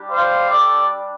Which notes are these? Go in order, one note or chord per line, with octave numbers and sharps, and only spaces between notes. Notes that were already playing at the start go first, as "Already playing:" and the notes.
Already playing: G3 D4 G4
C5 F5
A4 D5